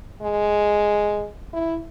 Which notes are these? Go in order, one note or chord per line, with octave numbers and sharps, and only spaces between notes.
G#3
E4